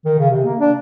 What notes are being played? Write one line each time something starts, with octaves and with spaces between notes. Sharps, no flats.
D#3
C#3
C3
A#3
D4